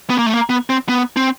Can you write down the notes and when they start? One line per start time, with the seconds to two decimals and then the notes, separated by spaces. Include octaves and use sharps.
0.10 B3
0.18 A#3
0.26 A3
0.34 A#3
0.49 B3
0.70 C4
0.89 B3
1.16 C4